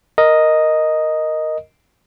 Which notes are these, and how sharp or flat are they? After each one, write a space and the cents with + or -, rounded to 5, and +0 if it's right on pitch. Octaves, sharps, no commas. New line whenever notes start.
A#4 +0 D#5 +0